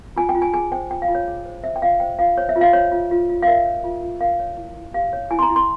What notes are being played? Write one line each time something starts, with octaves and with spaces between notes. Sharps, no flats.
F4 G#5
G5
F4
G#5
G#4 G#5
C5 G5
F4 G5
F5
F4
C#5
G#4
C5
C5 E5
G5
F4 F5
C5 G5
F4 F5
C5 C#5
E5
F4
F5
C5 C#5
F4
F4
F4
F5
A#4 E5
C#5
F4
F4
A#4 F5
C#5
E4
E4
G4 F5
C#5
E4 G#5
C6
A#5
E4
C6